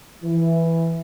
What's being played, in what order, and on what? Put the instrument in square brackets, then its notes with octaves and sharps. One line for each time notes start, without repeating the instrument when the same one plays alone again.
[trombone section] E3